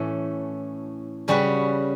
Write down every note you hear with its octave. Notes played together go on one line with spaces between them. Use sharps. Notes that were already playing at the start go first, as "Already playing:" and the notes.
Already playing: A2 E3 A3 C#4
C#3 G3 C#4 F#4 B4